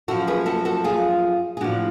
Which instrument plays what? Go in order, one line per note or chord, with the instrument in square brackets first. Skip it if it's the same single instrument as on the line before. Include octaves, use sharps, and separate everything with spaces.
[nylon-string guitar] F#2 F3 F#4 A4
G#4 B4
F#4 A4
F#4 A4
F4 G#4
G#4
A2 F3 D4 F#4